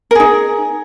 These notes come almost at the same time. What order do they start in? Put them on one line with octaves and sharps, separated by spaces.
A#4 G#4 D#4